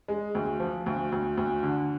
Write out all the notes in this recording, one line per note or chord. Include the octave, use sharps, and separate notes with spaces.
G#3
D2
F3
D2
D2
D2
D3